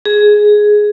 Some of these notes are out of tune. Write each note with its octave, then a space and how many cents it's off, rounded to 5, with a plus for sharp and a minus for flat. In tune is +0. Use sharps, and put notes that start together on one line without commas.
G#4 +5